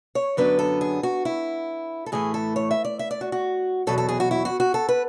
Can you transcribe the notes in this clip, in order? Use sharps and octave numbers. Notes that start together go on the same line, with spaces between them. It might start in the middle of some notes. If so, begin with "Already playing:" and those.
C#5
F#2 D3 F#3 B3 D4 B4
A4
G#4
F#4
E4
A4
A2 E3 A3 G#4
A4
C#5
E5
D5
E5
D5
F#4
F#4
E2 B2 F#3 A4
A4
G#4
F#4
E4
F#4
F#4
A4
B4